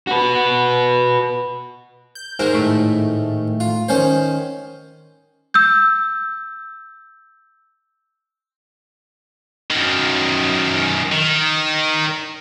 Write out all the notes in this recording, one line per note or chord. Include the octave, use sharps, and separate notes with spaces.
F#4 B4
G6
G#2 D#3 A#4 C5
A2 A3
F4
D#3 C#4 C5
E6 G6
F#2 D#3
D#3